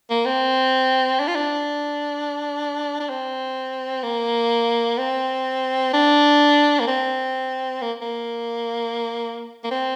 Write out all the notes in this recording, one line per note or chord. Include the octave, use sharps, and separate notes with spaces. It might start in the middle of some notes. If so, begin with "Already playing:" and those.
A#3
C4
D4
F4
D4
D4
C4
A#3
C4
D4
A#3
C4
A#3
A#3
A#3
C4